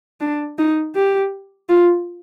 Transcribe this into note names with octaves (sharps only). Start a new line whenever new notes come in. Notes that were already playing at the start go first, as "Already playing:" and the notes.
D4
D#4
G4
F4